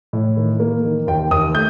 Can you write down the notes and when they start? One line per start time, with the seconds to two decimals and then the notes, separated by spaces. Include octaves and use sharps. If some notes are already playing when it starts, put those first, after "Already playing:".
0.13 A2
0.37 D#3
0.60 A#3
0.84 D#3
1.07 D#2 G5
1.31 D#2 D#6
1.55 A3 G6